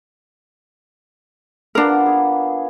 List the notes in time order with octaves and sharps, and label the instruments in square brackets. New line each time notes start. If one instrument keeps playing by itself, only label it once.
[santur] A#3 B3 F4 [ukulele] D4 A#4
[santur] G#4